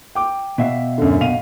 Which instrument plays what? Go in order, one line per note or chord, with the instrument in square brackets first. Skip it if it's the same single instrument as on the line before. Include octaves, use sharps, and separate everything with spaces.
[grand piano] G5 D6
[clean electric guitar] B2 E5 F5
[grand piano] F#2 D3
[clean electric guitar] B2 [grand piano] F5 D#7 F7